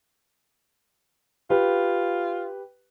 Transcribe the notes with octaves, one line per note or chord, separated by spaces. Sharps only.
F4 G4 B4